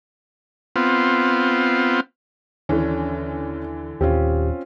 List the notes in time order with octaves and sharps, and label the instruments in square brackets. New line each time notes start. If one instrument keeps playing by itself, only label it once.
[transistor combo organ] B3 C4 F4
[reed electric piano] D#2 [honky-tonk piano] D3 E3 [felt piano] C#4
[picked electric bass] D#1 D#2 [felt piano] C4 C#4 F4 [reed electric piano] G4